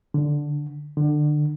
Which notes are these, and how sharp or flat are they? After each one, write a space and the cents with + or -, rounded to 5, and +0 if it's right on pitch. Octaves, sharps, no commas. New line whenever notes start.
D3 +0
D3 +25